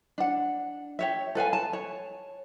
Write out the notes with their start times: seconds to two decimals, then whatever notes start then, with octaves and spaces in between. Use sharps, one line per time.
0.18 D4 F#5
0.99 G4 C#5 E5
1.35 A4 B4 F5 G#5
1.53 A5
1.73 C#5